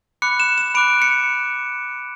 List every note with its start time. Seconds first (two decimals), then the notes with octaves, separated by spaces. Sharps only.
0.22 B5 D6 F#6 C#7
0.40 E7
0.58 E7
0.75 B5 D6 F#6 D7
1.02 C#7